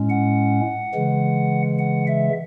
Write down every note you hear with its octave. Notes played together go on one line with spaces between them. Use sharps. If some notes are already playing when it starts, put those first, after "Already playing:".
Already playing: A2 G#3 C#4
F#5
C#3 E3 G#3
F#5
E5